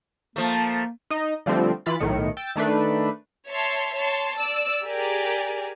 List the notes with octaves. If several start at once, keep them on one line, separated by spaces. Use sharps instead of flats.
F3 A3 A#3
D#4 D#5
D3 F3 G3 A3 C4
E3 F4 B5 A6
B1 A2 D#3 C#7
G5 E6 A6
D#3 A3 D4 B4
C#5 E5 A5 C6
C#5 A5 C6
D5 E6
G4 G#4 A#4 D5 G#5